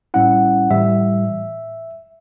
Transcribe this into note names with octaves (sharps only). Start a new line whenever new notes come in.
A2 G3 C#4 E4 F#5
A2 E3 G3 E5